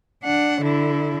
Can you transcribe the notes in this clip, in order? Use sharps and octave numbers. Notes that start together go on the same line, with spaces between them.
D4 F#5
D3 E4